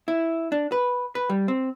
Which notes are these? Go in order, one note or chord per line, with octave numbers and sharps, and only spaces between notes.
E4
D4
B4
B4
G3
C4